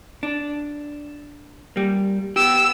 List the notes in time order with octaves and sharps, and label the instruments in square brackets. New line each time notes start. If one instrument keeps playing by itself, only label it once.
[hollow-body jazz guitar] D4
G3 A#3
[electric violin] B3 E6 [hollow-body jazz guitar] G4